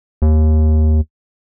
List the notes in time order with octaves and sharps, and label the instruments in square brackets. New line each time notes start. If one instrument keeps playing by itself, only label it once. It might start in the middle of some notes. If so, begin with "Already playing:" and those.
[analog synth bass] D#2